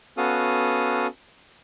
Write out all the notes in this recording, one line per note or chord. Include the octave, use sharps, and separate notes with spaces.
B3 C#4 F#4 A4 F5 D#6